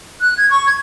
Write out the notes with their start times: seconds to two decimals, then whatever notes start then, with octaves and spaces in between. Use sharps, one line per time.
0.21 F#6
0.37 G#6
0.51 C#6
0.66 G#6